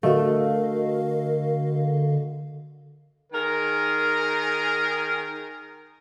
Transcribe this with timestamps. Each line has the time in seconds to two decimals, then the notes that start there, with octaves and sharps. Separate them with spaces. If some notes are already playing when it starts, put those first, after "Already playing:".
0.03 D3 A3 F#4 A#4 D#5 F5
3.33 D#3 G#4 A#4